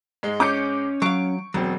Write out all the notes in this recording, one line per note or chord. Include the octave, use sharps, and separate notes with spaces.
G#2 G#3 D#4
C#4 C#5 D6 G6 C#7
F#3 F5 C#6 D7
E1 B2 F#3 C4